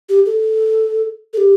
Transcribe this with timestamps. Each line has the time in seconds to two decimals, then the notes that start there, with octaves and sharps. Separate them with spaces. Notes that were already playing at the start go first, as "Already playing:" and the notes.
0.09 G4
0.26 A4
1.33 A4
1.37 G4